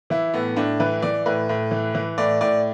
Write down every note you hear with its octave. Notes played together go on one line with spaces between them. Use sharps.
E3 E4
A2 B3
A2 D4
E3 B4
E3 D5
A2 B4
A2
E3
E3
A2 D5
A2 D5